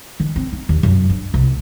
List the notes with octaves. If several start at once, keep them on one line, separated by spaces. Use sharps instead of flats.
D#3
C4
D#4
D#2
F#2
D4
C2